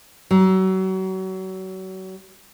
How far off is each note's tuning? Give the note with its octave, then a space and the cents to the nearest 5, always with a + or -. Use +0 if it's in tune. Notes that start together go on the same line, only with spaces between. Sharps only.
F#3 +30